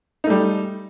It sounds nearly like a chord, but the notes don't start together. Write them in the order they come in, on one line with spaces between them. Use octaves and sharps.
D#4 A3 G3